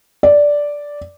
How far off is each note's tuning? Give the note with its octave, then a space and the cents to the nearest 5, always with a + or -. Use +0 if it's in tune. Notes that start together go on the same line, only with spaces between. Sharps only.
D5 -5